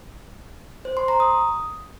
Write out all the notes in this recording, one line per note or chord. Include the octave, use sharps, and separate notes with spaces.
C5
C6
A#5
D#6